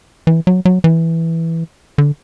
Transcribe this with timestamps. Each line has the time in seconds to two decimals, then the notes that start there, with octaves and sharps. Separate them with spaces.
0.27 E3
0.47 F#3
0.65 F#3
0.84 E3
1.98 D3